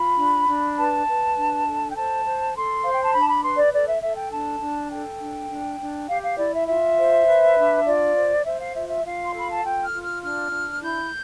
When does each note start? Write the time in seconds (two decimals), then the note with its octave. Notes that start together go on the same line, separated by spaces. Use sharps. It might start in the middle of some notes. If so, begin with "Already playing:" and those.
Already playing: F4 B5
0.17 D4
0.47 D4
0.77 B4 A5
1.07 B4
1.35 D4
1.65 A4
1.89 G5
1.95 C5 A5
2.24 C5
2.54 A4 C6
2.83 C5 F5
2.93 G5
3.03 A5
3.12 D4 B5
3.22 A5
3.28 B5
3.43 B4 C6
3.57 D5
3.72 A4 D5
3.86 E5
4.02 A4 E5
4.17 G5
4.31 D4 A5
4.60 D4
4.90 A4 G5
5.19 D4
5.49 D4
5.79 D4
6.08 G4 F5
6.23 F5
6.38 E4 D5
6.53 E5
6.67 F4 E5
6.97 C5
7.26 B4
7.57 D4
7.85 F4 D5
8.15 C5
8.45 C5 E5
8.60 F5
8.74 F4 E5
8.89 E5
9.05 F4 F5
9.24 C6
9.34 A4 B5
9.50 A5
9.63 F4 G5
9.82 F6
9.92 F4
10.02 F6
10.22 D4 F6
10.52 D4
10.81 E4 G6